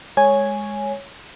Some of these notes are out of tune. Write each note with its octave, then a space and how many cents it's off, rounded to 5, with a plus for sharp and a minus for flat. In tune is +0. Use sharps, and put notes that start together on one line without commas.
G#3 +0 C#5 +0 G#5 +0